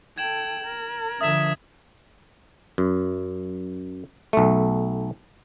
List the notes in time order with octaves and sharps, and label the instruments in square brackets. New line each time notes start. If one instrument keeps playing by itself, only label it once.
[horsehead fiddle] A4 G5 [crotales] G#6 E7 F#7
[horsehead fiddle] A#4
[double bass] D3 F3 [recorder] E5 [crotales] D#6 G#6
[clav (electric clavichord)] F#2
B1 A3